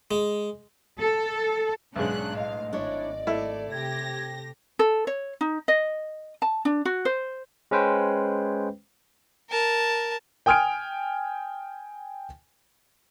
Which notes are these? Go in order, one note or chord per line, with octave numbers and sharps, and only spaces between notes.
G#3
A4
B1 G#2 C#4 D4 F#6
A2 D#5 F5
G#1 D4 E4 C#5 D5
A3 E4
C3 G4 G#6 A#6
A4
C#5
D#4
D#5
A5
D4
F#4
C5
G#3 C#4 B4 C5 G5
A#4 A5
G5 G#5 D#6 F6 G#6 D7